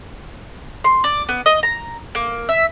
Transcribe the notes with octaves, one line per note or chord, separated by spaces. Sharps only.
C6
D5
B3
D#5
A#5
A#3
E5